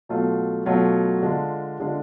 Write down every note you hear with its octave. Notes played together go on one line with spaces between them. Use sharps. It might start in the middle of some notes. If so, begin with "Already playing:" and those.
B2 F#3 A3 F4
B2 F#3 A3 F4
D3 G#3 D4 F4
D3 G#3 D4 F4